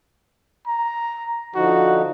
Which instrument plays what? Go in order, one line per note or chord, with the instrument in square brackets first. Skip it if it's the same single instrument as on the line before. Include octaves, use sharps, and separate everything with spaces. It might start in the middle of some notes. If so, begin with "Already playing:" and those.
[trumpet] A#5
[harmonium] D3 F3 D#4 [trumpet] F#4